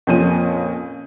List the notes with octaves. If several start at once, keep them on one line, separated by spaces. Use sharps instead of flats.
F2 A#2 F3 C#4 D#7